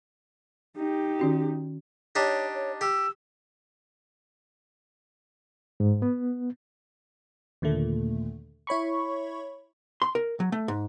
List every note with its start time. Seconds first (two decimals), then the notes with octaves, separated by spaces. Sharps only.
0.76 D#4 G4
1.19 D#3 C#4 F#4
2.15 D4 D#4 G4 C#5
2.54 C#5
2.81 G4 E6
5.80 G#2
6.02 B3
7.62 D#2 A#2 D3 A3
8.67 E4 C#5 B5 C#6
10.02 C6
10.15 A#4
10.40 F#3
10.52 A3
10.68 G#2